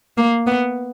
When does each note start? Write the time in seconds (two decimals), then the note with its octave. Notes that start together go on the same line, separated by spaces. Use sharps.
0.18 A#3
0.47 B3